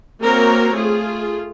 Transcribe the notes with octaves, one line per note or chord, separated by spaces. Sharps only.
A#3 C4 F#4 A#4 C#5
A3 F4 G#4